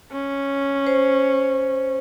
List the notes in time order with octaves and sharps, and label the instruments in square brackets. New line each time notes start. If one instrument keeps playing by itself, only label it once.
[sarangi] C#4
[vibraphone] C5